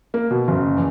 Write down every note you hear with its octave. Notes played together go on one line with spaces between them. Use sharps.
A#3
B2
F#1
E2